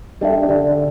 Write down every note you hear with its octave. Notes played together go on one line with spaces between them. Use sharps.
G3 D4 A4 E5
D3